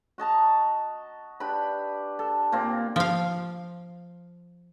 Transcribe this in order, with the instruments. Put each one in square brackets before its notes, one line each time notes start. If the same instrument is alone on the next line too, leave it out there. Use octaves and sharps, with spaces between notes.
[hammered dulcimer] F#4 D#5 A5 A#5
D4 G4 B4 B5
A4
A#2 A#3 C4
[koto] F3 F5